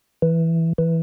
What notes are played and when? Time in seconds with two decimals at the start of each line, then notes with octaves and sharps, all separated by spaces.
0.22 E3
0.78 E3